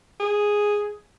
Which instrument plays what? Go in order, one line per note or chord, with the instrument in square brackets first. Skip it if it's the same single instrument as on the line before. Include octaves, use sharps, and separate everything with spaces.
[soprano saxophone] G#4